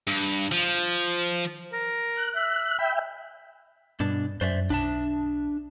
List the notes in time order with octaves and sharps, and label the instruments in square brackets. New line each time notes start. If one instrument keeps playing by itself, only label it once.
[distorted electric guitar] G2
F3
[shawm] A#4
[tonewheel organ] F#6
[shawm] E5
[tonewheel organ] E5 G5 [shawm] B5
[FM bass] G2 [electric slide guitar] B2 D4
[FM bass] F#2 [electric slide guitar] C5 D5 E5
[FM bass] B1 [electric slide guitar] D4 E5 A5